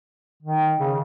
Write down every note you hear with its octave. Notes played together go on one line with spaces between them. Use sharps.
D#3
C#3